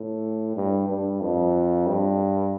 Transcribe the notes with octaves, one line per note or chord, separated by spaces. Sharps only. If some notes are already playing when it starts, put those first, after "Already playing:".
Already playing: A2
G2
G2
F2
G2